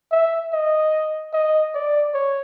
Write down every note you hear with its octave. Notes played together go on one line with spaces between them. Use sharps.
E5
D#5
D#5
D5
C#5